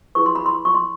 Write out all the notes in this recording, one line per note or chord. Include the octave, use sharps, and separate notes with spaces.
E4 G#4 B4 C#6
C6
B5
C6
C#6
C6